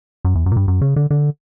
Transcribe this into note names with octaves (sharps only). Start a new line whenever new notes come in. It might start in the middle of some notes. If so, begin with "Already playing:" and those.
F#2
E2
F#2
A#2
G2
F#2
C#3
D3
D3